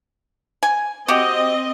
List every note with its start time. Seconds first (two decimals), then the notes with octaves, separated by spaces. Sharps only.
0.63 G#5
1.08 C4 F#4 G4 D#5